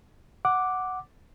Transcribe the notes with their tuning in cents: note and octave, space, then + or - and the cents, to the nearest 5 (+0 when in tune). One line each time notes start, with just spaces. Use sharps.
F#5 +0 D6 +0